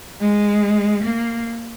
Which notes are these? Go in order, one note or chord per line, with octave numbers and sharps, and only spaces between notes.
G#3
A#3